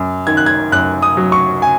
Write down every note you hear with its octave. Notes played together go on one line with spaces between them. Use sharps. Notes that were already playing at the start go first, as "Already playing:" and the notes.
Already playing: F#2
D#3 G#6
F#6
G#6
F#2 F#6
D#6
F#3
C#6
G#5